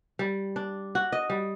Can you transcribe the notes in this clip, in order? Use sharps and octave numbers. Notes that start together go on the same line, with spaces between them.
G3
D4
F#4
D#5
G3